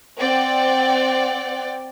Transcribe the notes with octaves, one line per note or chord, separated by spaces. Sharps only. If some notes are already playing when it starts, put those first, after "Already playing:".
C4 D5 F#5 G5